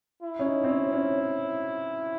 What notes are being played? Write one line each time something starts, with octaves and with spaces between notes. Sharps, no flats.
E4
C#4
D#4
C4
C#4
C#4